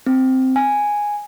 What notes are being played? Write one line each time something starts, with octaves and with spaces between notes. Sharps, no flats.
C4
G#5